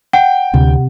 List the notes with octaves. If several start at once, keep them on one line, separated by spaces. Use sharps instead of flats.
F#5 G5
D2 C3